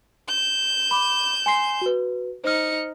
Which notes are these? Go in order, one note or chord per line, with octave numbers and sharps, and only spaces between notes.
G6 E7
B5 D6
G#5 C6 C7
F#4 B4
D#4 C5 F6 C#7